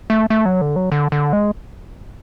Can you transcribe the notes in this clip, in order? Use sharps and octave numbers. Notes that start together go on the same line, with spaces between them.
A3
A3
F#3
D3
F#3
D3
D3
G#3